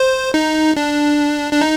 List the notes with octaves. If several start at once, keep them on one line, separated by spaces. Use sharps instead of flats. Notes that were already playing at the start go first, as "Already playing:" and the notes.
Already playing: C5
D#4
D4
D4
D#4